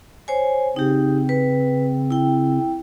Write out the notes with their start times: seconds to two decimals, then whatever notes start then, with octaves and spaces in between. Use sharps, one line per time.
0.28 C5 C#5 G#5
0.76 C#3 C4 D#4 G4
1.29 B4
2.10 E4 G5